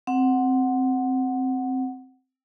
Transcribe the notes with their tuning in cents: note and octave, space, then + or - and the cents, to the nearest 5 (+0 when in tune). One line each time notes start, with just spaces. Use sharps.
C4 +0 F#5 +0